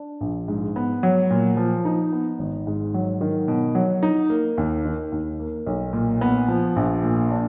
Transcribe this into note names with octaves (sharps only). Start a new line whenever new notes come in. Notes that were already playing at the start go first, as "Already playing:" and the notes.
Already playing: D4
A#1
G#2
B3
F#3
A#2
F3
D#4
B3
G#1
G#2
F#3
D#3
B2
F#3
D#4
A#3
D#2
D#3
D#2
A#3
B1
A#2
B3
F3
A#1
A#2
D4